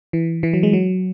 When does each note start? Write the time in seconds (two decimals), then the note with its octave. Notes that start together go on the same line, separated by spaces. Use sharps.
0.13 E3
0.43 E3
0.53 F#3
0.63 G#3
0.73 F#3